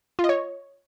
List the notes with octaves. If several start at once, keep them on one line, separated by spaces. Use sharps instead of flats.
F4
D#5
C#5